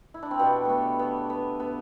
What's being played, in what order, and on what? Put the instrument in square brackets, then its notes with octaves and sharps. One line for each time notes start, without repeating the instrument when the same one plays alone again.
[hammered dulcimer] E4
D4
C4
B2 G3 B3
A3 B3
B3
B3
B3